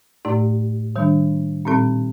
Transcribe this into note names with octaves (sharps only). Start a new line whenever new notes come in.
A2 A3 D#4 G4 D5
D#3 G3 D4
A#2 G3 C4 D#4 A4